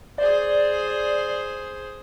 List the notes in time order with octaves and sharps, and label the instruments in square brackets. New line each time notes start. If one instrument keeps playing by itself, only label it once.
[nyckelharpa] G#4 C5 [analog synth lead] D5